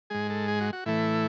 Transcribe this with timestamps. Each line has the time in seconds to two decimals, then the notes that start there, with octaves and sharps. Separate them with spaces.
0.10 G#2 G#3 G#4
0.30 A4
0.48 G#4
0.61 F#4
0.73 F#4
0.86 A2 E3 A3 E4